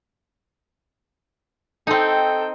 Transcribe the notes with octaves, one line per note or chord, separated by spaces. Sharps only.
C4 D#4 A4 G5